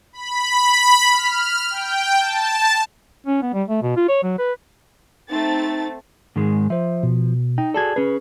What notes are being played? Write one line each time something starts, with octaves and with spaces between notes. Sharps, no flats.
B5
F6
G5
A5
C#4
B3
G3
A3
B2
F4
C#5
F#3
B4
A3 C4 D#4 A6
G#2 D#3 G#3
F3 C5 E5
B2
D#4 G5
F#4 G#4 A4 D5 A5 G#6
C#4 G#4 B4